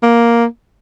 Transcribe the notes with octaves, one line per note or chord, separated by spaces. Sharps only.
A#3